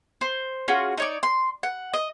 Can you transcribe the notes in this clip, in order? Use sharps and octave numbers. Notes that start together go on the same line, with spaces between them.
C5
C#4 F4 F#4 G#4
D#4 C#5 D5
C6
F#5
D#5